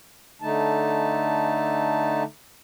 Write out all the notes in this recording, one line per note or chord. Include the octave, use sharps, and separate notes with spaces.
D3 A3 D#4 A5